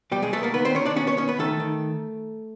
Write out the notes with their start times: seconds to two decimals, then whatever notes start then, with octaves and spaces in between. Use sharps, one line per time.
0.12 B2 G3 G4
0.22 G#3 G#4
0.33 A3 B3 A4
0.43 A#3 A#4
0.54 D#3 B3 B4
0.65 C4 C5
0.75 D#3 C#4 C#5
0.85 D4 D5
0.96 B3 C#4 C#5
1.07 C#4 C#5
1.17 B3 C#4 C#5
1.28 B3 B4
1.38 D#3 A3 A4
1.60 D#3